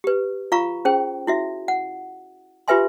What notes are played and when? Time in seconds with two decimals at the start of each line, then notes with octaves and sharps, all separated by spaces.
0.04 G4 B4
0.52 F4 F5 A#5 C#6
0.85 C#4 G#4 C5 G5
1.27 E4 F#4 E5
1.68 F#5
2.68 F4 G4 B4 E5 G#5 C6